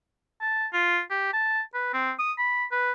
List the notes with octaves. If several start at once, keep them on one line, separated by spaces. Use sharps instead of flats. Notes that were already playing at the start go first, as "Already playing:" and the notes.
A5
F4
G4
A5
B4
C4
D#6
B5
B4